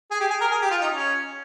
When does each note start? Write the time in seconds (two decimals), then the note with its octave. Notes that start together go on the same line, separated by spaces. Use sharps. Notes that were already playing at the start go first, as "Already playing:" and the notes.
0.11 G#4
0.20 G4
0.30 G#4
0.41 A#4
0.51 G#4
0.61 G4
0.70 F4
0.81 D#4
0.91 C#4